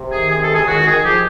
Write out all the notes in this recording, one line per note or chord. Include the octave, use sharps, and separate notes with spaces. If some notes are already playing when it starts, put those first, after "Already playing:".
Already playing: C3
D#3 G#4
C3 G#4
A4
C#2
G#4
D#3 F#4
D#3 G#4
F3 G4